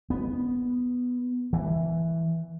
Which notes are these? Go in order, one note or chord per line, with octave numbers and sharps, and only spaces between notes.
B3
E3